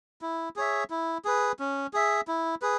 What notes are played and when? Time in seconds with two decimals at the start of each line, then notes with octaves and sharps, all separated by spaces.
0.22 E4
0.56 G#4 C#5 E5
0.90 E4
1.25 G#4 B4
1.59 C#4
1.93 G#4 E5
2.28 E4
2.62 G#4 B4